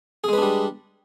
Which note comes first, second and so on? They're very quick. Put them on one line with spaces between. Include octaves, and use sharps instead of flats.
G#4 G#3 B4 D4 G3